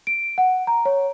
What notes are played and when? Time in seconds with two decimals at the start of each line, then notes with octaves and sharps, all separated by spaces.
0.07 D7
0.38 F#5
0.67 A#5
0.85 C#5